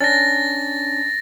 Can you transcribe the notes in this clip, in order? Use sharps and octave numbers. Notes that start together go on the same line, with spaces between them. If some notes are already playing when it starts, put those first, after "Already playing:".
C#4 D4 A6 A#6